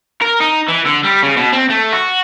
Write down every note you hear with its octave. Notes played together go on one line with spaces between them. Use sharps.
A#4
D#4
E3
D3
G3
C#3
B2
C4
A3
F#4